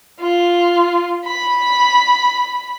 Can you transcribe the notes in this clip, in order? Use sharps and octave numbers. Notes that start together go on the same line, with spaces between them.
F4
B5